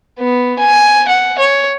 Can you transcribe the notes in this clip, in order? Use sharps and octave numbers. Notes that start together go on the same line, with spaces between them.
B3
G#5
F#5
C#5